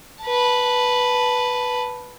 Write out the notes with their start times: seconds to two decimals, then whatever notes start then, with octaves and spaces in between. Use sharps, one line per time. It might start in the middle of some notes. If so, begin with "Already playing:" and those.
0.24 B4 A5